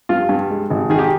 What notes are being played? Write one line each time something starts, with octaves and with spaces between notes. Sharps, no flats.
G2 F4
G2
G#3
G#1
D#3 G#4
G4